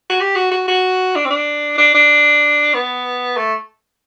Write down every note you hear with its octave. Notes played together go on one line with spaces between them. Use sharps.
F#4
G4
F#4
F#4
F#4
D4
C4
D4
D4
D4
B3
A3